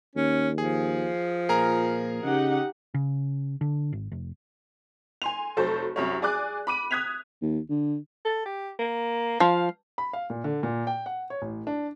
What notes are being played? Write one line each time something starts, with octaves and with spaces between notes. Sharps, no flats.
D#2 C#4
F3 G#4
A#2 G#4 A#4 A#5
C#3 D#4 G4 F#5
C#3
D3
G#1
F1
G#5 C6 F7
F1 F#3 A4 C5 C#6
C2 F#2 C#5
G#4 D5 G#5 D6 F#6
B5 D6 D#7
D#6 F#6 G#6 B6 F7
D#2
D3
A4
G4
A#3
F3 F5
B5
F5
A#2
D3
A#2
G5
F#5
C#5
A1
D4